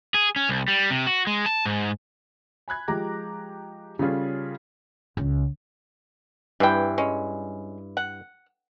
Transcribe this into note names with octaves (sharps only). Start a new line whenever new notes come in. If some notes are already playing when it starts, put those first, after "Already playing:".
G#4
C#4
C2
G3
C3
F#4
G#3
A5
G#2
G#5 B5 F#6 G#6
F3 G#3 G4 A#5 D6 A#6
C#3 G3 C#4 F4 G#4 A4
C#2
G2 E3 C4 E4 G5
G#3 C#4
F#5